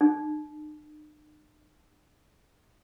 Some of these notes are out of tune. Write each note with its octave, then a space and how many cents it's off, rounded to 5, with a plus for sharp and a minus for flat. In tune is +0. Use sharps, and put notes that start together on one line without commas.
D#4 -45